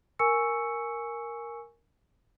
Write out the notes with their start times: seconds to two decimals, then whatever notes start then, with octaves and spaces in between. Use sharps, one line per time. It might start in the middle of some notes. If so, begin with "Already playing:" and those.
0.19 A#4 G#5 C#6 E6 C#7